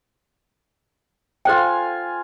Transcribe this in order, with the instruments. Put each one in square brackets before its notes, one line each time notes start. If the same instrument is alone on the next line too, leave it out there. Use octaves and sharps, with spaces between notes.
[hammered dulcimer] F4 G#5 [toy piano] A4 C5 G5